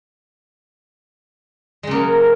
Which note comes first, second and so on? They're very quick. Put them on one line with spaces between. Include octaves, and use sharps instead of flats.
G#3 C#3 A#3 F#3